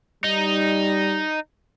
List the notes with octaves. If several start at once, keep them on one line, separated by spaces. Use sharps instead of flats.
G3 D#4